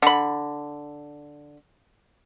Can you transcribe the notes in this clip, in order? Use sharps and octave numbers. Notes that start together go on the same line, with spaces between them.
D3 B5